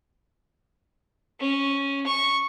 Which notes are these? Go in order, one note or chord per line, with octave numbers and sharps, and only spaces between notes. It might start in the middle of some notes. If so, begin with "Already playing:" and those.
C#4
C#6